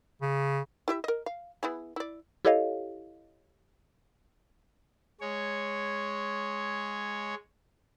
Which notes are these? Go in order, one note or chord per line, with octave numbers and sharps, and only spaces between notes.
C#3
E4 G4 E5
A#4 D#5
F5
B3 E4 G#4
E4 D5
E4 G4 A4 C#5 D#5 F5
G#3 C#5